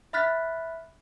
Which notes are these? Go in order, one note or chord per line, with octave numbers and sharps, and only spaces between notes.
E5 B5 F6 F#6 A6 B6